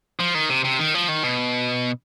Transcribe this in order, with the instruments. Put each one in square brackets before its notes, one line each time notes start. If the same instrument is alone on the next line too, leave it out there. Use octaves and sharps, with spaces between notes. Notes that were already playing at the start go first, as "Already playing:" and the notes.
[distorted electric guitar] F3
D#3
C3
C3
D#3
F3
D#3
B2